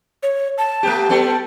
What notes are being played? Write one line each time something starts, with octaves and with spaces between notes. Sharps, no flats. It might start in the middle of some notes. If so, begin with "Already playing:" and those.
C#5
A5
A3 B3 G4
G3 B3 A4